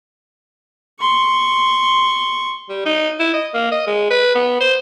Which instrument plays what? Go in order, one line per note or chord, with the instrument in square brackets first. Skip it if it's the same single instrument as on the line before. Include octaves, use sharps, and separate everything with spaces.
[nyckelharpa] C6 C#6
[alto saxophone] G3
D#4
E4
D#5
A#3
D#5
G#3
B4
B3
C5